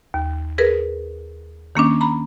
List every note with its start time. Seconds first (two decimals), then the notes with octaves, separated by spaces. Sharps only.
0.14 D#2
0.58 G#4 A#4 B4
1.75 D#3 A#3 C#4 D4
2.01 A#5 B5